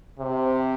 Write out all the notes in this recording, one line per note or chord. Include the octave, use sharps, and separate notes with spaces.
C3